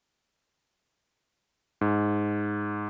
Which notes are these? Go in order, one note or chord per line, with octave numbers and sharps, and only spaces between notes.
G#2